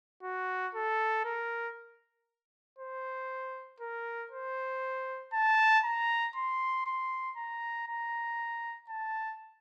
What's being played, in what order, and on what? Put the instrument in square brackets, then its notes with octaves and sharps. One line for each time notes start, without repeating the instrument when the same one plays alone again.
[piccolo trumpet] F#4
A4
A#4
C5
A#4
C5
A5
A#5
C6
C6
A#5
A#5
A5